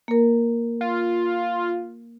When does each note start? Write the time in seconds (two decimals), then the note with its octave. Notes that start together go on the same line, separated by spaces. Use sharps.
0.08 A#3 A#4
0.81 F4